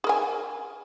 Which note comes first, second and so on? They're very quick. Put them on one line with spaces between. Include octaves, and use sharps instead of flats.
G#4 A#4 G#5